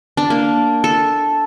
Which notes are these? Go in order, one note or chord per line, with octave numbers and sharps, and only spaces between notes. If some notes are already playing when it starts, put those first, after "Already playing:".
D4
A#3
A4